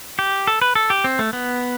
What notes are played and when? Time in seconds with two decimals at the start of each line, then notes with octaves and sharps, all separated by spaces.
0.19 G4
0.47 A4
0.62 B4
0.75 A4
0.90 G4
1.04 C4
1.19 A3
1.33 B3